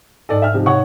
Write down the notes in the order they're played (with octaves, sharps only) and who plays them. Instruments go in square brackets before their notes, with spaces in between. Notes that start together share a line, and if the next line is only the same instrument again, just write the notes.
[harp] G#2 D#5 [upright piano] A4 D5
[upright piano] E5 F6
C3 F3
[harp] C3 [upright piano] C#5 F#5 C#6